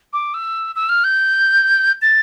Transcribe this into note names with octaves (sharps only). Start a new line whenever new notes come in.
D6
E6
E6
F6
G6
A6